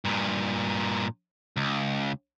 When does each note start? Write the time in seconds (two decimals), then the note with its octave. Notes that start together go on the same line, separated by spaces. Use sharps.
0.05 G2 A#2
1.57 C#2